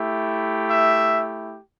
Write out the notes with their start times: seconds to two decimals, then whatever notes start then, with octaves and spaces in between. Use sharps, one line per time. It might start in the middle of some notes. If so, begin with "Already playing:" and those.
Already playing: A3 E4 G4
0.70 E5